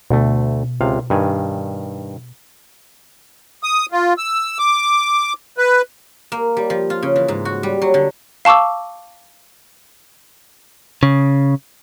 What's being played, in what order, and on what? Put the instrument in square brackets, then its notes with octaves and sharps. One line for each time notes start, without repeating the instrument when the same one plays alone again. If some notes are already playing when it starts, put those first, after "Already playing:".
[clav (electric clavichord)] D2 A3 [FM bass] B2
[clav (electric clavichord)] C#2 C3 F5
G2 D#3 G#5
[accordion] D#6
F4
E6
D6
B4
[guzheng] A#3
G3
F3
F4
C#3
E3
G#2
F#4
G3
F#3
D3
[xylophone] F5 A5 C#6 D6 E6
[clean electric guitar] C#3